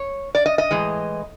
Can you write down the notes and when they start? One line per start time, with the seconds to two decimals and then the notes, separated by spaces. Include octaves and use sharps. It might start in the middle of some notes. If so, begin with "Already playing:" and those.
Already playing: C#5
0.35 D5
0.46 D#5
0.58 D#5
0.71 A2 E3 G#3